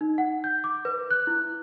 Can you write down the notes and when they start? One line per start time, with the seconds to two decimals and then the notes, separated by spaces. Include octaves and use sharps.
0.01 D#4
0.18 F#5
0.44 G6
0.64 D6
0.85 B4
1.11 F#6
1.27 E4